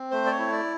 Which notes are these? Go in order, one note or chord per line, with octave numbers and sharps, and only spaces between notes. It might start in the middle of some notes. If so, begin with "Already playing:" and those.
Already playing: C4
A3 C5
D5
C#5
E4
D5